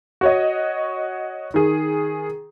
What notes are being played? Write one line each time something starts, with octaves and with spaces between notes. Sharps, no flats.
F#4 C#5 D#5
D#3 G#4